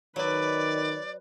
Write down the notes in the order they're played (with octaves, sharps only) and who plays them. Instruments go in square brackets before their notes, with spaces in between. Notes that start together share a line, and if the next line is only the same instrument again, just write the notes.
[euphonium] D#3 [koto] F#3 G#5 [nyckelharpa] B4 [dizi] D5